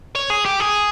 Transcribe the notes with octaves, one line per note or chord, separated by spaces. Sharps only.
C#5
G#4
G4
G#4